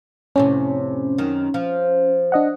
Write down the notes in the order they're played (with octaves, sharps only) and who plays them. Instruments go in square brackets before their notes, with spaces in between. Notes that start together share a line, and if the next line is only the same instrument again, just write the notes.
[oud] F2 A2 C3 [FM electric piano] C#4
[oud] F#2 D#3
F3
[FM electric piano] D4 D#5 F#5